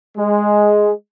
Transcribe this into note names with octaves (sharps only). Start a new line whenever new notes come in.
G#3